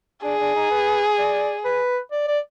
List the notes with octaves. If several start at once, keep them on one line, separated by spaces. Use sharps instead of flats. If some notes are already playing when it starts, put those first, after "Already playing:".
D4 G#4
D4
D#4
B4
D5
B4
D5
D5